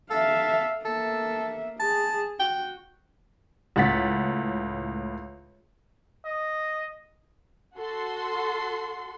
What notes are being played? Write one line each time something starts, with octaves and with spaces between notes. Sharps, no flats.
A4 E5 F5
A#3 A4 E5
G#4 A5
F#4 G5
C#2 A2 F#5 A6 B6
D#5
F#4 A4 C6